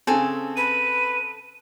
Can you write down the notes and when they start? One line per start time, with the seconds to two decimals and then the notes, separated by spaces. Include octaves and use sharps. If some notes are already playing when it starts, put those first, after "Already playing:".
0.07 C#3 C4 A4 G#5
0.57 B4 D#7